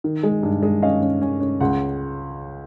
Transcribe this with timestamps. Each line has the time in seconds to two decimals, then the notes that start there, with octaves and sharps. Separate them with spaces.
0.04 D#3
0.23 G#3
0.43 G2
0.63 G#3
0.83 C#4 D#5 F5
1.02 C#4
1.21 C#4
1.41 C#4
1.60 C#2 F#5